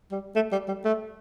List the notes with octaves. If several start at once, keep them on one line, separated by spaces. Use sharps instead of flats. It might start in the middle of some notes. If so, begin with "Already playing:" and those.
G3
A3
G3
G3
A3